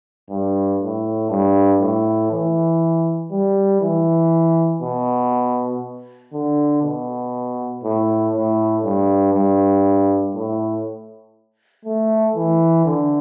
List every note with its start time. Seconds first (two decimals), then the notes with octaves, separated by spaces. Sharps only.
0.30 G2
0.81 A2
1.30 G2
1.81 A2
2.31 E3
3.31 G3
3.82 E3
4.82 B2
6.33 D3
6.83 B2
7.84 A2
8.34 A2
8.84 G2
9.34 G2
10.35 A2
11.85 A3
12.36 E3
12.86 D3